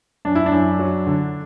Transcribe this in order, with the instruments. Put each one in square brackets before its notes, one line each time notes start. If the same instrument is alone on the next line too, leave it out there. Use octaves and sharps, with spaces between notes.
[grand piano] F#2 D4
E4
D4
F#2
F#3
D3